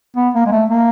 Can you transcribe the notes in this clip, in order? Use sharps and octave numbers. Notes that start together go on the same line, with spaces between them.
B3
A#3
G#3
A3
A#3